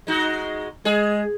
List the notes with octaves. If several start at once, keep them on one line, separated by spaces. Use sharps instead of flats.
G#3 D#4 F#4
G#3 G#4